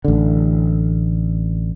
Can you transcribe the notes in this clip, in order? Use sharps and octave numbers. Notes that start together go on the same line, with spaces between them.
A1 D3